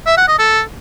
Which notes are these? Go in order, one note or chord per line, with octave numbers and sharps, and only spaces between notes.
E5
F#5
D#5
A4